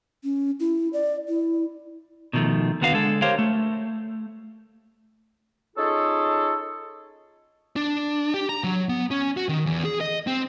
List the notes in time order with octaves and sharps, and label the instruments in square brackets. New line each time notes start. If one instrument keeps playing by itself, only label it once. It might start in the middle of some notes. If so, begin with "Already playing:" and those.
[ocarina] C#4
E4
D5
E4
[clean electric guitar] B2 D#3 F3 A3
D#2 D3 B3 F#4 G4 F5
D3 G#3 A4
G4 A#4 C5 C#5 F5
A3
[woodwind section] C#4 D#4 F4 G#4 A4
[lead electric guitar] D4
G4
A#5
F#3
B3
C#4
F#4
D#3
E2
G#4
D#5
C4